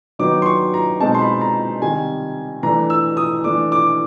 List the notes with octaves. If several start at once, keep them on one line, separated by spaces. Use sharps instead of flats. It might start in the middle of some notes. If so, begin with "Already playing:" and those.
D#3 F#3 B3 D#4 D6
C6
C#6
A#5
B2 G#3 C4 D#4 A5
C6
B5
A#5
C3 D#3 G3 G#5
E3 A3 D4 A#5
E6
D#6
E3 A3 D4 D6
D6